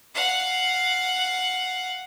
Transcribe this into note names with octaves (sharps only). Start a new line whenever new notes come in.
F5 F#5